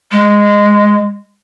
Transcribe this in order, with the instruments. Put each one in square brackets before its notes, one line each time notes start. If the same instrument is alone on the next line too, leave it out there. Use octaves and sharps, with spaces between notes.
[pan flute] G#3